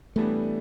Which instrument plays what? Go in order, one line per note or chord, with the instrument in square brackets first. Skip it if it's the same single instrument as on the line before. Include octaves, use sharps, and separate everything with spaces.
[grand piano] A2 E3 G3 B3 D4 [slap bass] A3